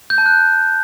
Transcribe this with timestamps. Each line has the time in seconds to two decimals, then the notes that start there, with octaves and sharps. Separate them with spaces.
0.10 G6
0.18 A5
0.26 F#6